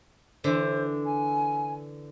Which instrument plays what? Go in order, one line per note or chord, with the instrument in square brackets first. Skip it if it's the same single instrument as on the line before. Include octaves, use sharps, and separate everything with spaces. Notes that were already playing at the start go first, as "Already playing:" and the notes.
[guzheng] D3 E3 [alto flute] C5
[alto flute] G#5